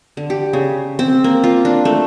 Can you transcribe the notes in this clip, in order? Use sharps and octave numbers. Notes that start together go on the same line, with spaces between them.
D3
G4
C#3
C4
A#3
F4
D4
A3